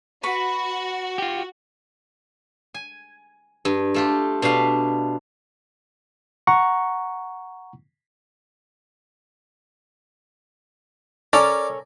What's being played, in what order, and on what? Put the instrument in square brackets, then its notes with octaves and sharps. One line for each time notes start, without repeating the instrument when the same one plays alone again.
[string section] F#4 [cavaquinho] B4 B5 C#6
[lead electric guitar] F4 G4
[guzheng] G#5
G2
A3 F4 G4
B2 D4 B4 F5
[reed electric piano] F#5 A#5 C#6
[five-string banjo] C#4 A4 A#4 [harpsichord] D5